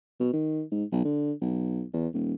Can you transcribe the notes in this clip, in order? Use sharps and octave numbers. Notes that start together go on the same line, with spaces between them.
B2
D#3
G#2
B1
D3
B1
E2
D#1